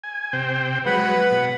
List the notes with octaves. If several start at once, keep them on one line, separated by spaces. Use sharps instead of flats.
G#5
C3 C5 G5
F#3 G#3 B4 F#5 B5
B2